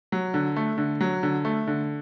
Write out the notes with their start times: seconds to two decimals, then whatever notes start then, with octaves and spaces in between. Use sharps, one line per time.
0.12 F#3
0.34 D3
0.56 A3
0.78 D3
1.01 F#3
1.23 D3
1.45 A3
1.68 D3